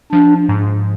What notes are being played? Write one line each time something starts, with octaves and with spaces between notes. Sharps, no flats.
F3 D4
G#2